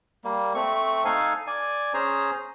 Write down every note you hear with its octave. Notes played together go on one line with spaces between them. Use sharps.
G3 A#3
A3 C4 C#6
D#4 A4 F5 G#5
D5 G#5
C#4 G#4 C5 A#5